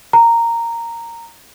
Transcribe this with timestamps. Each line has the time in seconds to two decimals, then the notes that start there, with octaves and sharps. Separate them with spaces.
0.13 A#5